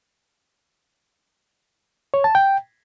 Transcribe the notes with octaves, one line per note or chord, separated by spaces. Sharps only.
C#5
A5
G5